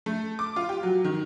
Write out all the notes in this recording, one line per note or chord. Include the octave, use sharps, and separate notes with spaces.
A3
D6
F4
G4
F#3
D#3